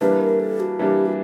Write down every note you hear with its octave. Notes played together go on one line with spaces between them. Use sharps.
E3 G3 A#3 D4 B4
A#4
A4
F#4
E3 G3 A#3 D4 G4
F#4